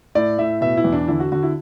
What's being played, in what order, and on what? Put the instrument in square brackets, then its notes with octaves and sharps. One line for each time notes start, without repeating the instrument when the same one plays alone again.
[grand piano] A2 D5
A2 E5
B2 E5
E4
E2
D4
D3 E4
F#4
D3 F#4
E4